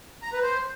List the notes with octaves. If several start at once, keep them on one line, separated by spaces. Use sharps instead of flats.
A#5
B4
C5